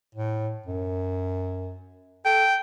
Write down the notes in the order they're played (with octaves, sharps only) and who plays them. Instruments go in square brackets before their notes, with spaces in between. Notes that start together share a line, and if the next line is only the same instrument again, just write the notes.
[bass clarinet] A2
F#2
[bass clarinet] A4 [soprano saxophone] G5